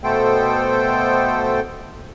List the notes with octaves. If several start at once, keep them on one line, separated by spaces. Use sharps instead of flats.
B2 A3 B3 A4 C5 G5